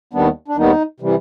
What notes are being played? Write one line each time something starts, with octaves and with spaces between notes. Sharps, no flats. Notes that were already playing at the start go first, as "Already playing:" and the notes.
D#2 D#3 G3 B3 D4
D4
D#2 D#3 G3 B3 D#4
C3 E3 G3